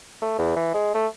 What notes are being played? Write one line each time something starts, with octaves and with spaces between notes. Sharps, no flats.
A3
E2
E3
G#3
A3